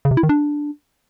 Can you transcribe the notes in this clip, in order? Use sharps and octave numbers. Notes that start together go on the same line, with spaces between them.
C#3
C3
E4
D#3
D4